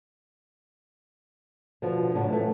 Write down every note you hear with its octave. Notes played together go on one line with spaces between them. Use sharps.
B2 D3 F3
A2 C#3 F#3 C#4 D4
E3 A3